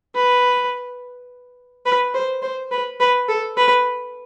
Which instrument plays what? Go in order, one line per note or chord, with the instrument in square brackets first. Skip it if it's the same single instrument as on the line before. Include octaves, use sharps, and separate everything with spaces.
[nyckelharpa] B4
B4
C5
C5
B4
B4
A4
B4